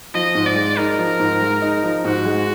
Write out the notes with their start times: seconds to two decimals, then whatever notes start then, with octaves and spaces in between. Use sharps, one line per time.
0.14 F3 D#5
0.35 G#2
0.46 D5
0.56 G#3
0.77 D#4 A#4
0.98 F3
1.19 G#2
1.41 G#3
1.62 D#4
1.83 F3
2.05 G#2 F#4
2.25 G#3